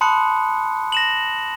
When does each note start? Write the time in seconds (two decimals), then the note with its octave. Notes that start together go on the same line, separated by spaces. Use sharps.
0.01 A5 B5 C6 D#6 F#6 C#7
0.92 A#6 E7 F#7